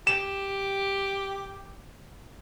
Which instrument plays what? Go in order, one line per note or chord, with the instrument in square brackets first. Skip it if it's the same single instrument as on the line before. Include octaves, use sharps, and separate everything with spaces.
[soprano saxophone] G4 [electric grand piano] E7